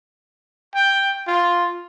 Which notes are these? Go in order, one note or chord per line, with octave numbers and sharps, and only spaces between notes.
G5
F4